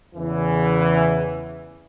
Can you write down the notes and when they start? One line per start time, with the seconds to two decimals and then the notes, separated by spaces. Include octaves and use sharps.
0.15 E2 C#3 E3